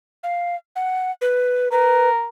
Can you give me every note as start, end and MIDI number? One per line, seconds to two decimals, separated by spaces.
0.23 0.56 77
0.76 1.11 78
1.21 1.68 71
1.72 2.27 70
1.72 2.09 71